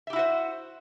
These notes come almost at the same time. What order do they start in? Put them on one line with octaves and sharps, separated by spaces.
E5 G4 E4 F#4 C5